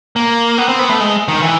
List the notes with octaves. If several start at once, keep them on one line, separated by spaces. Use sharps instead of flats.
A#3
B3
C4
B3
A3
G#3
D#3
E3